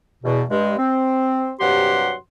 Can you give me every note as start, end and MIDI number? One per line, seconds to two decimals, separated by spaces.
0.24 0.43 40
0.24 0.43 47
0.50 0.77 43
0.50 0.77 56
0.78 1.51 60
1.60 2.14 43
1.60 2.14 48
1.60 2.14 54
1.60 2.14 67
1.60 2.14 78
1.60 2.14 84